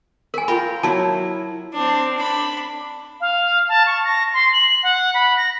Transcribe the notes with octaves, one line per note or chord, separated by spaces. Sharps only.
A#4 G#5 B5
F4 A#4 G5 B5
F#3 E4 A5
C4 D4
D4 B5
F5
A5
C#6
A#6
C6
F#7
F#5
B5
A#6